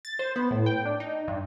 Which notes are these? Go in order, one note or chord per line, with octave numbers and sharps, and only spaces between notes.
A6
C5
B3
A2
G5
D4
D#4
G2